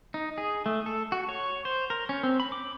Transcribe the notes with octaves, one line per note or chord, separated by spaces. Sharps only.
D#4
G#4
A3
A4
F#4
C#5
C5
A#4
C#4
C4
B5
D6